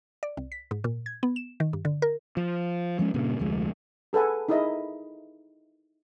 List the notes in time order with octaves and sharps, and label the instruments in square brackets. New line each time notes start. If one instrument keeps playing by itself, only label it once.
[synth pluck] D5
C2
B6
G#2
A#2
G#6
B3
E7
D#3
G2
D3
A#4
[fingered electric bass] F3
F3 G#3 C#4
G2 A#2 C#3
F1 D2 F3 G#3
[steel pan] G#4 A4 B4 F#5 G#5
D#4 E4 G#4 A#4 D#5 E5